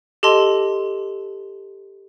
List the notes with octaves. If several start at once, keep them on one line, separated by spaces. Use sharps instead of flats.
G4 A4 D#5 A5 C6